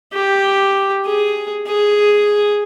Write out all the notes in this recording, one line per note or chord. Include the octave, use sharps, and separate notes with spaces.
G4
G#4
G#4